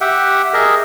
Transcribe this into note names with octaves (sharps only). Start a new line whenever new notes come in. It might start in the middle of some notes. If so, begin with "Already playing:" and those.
G4 E5 F#5 G5
G#4 A#4 D#5 E5